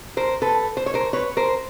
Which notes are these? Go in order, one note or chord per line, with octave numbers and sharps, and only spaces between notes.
A#4 C5
A4 B4
C5
C#5
A#4 C5
B4 C#5
A#4 C5